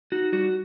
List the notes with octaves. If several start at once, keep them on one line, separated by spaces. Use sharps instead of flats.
D#4 F#4
G3 F#4